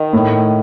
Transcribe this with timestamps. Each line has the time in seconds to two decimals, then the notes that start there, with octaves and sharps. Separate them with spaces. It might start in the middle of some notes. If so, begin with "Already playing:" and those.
Already playing: D#3
0.13 A2